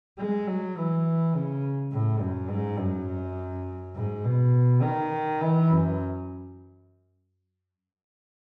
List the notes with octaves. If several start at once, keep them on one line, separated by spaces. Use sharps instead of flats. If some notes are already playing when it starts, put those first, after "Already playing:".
G#3
F#3
E3
C#3
A2
F#2
G#2
F#2
G#2
B2
D#3
E3
F#2